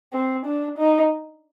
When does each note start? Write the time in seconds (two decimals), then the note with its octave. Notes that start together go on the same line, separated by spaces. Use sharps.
0.13 C4
0.46 D4
0.78 D#4